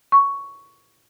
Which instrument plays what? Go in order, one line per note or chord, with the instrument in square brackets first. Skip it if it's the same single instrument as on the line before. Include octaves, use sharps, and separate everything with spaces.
[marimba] C#6